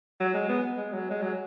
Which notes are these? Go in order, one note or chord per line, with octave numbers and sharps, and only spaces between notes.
F#3
G#3
B3
G#3
F#3
G#3
F#3